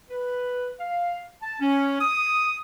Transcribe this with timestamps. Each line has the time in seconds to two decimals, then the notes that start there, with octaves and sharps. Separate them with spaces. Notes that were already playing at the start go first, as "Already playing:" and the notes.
0.10 B4
0.80 F5
1.43 A5
1.60 C#4
1.99 D#6